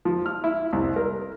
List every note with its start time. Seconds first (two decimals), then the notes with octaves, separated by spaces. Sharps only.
0.05 F3
0.26 F6
0.44 E4
0.73 C2
0.96 A#4